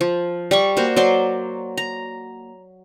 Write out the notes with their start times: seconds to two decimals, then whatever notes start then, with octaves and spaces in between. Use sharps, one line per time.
0.01 F3
0.51 G3 D5 C#6
0.77 A#3 F#4 C5
0.96 F#3 C5 D5 C6
1.77 A#5